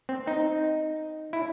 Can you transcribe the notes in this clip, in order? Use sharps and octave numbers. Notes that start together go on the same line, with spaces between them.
C4
D#4
E4